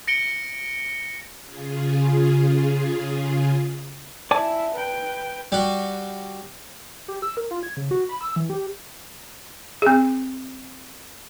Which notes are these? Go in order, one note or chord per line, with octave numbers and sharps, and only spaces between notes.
A#6 C#7 D7 G7
C#3 F4 G#4
E4 D5 E5 G#5 A5
B4 G5
G3 F#4
G4
E6
A#4
F4
G#6
C#3
F#4
B5
E6
E3
G4
C4 G#4